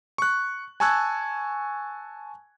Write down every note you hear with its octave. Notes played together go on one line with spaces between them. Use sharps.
C#6 F#6
G#5 A5 C#6 E6 F#6 G#6